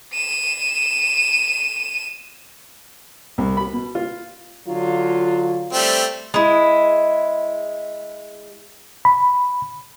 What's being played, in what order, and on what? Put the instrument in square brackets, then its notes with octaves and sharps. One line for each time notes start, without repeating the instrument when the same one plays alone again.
[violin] D#7 E7
[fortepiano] C2
B5
B2
F4
[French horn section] D3 F#3 F4
[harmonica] G3 A3 C4
[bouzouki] G#3 E4
[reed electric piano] B5